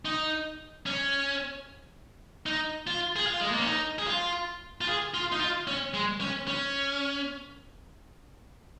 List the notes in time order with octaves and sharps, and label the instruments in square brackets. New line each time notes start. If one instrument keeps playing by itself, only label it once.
[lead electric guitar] D#4
C#4
D#4
F4
G#4
F4
G#3
A#3
C#4
D#4
G#4
F4
F4
G#4
F4
D#4
F4
C#4
G#3
C#4
C#4